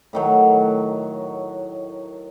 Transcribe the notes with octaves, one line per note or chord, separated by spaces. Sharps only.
A2 D#3 F#3